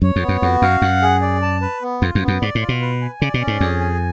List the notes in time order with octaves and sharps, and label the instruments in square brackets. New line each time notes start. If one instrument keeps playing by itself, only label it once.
[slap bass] F#2 [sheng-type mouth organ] C#5
[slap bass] F2
[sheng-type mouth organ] B3
[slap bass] F#2
[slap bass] F2 [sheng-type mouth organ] F#4
[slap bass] F#2 [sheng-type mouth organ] F5
[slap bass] F#2 [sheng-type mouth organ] F#5
[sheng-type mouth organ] G#4
D5
A5
B4
B3
[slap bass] F2 [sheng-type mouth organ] F4
[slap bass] F#2
[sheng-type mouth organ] B3
[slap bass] F#2
[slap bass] G#2 [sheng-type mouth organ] D5
[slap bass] A2
[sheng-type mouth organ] F4
[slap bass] B2
[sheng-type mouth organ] B4
G#5
[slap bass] C#3 [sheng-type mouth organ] D5
[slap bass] B2
[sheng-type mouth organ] C#4
[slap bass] G#2
[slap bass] F2 [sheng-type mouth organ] G#4
[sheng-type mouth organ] G#5